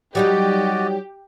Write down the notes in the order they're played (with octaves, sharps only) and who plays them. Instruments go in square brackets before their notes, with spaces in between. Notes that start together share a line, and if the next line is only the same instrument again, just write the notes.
[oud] F#3 G3 D#4 [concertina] F#4 D5 D#5 [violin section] G4